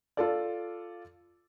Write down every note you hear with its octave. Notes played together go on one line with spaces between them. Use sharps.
F4 A4 D5